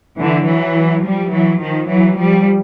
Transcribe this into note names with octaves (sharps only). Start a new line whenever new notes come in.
D3 E3
E3 F#3
F3 G3
E3 F#3
D#3 F3
E3 F#3
F3 G3